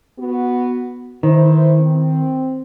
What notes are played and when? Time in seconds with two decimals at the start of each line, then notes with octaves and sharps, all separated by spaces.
0.18 B3 F#4
1.23 D#3 E3 E4 C5
1.80 C4